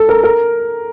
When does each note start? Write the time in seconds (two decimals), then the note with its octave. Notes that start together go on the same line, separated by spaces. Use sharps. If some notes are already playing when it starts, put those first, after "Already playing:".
Already playing: A4
0.09 A#4
0.23 A#4